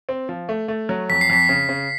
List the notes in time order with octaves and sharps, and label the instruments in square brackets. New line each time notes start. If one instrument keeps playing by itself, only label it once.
[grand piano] C4
F3
A3
A3
F#3
[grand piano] F2 [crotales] B6
[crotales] C7
[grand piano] F2 [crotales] B6
[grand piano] C#3
C#3